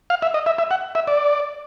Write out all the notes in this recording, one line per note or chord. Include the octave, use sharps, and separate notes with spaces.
F5
E5
D#5
E5
E5
F#5
E5
D5